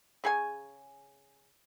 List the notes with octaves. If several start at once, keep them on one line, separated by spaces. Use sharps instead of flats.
C#3 G#4 C#5 G#5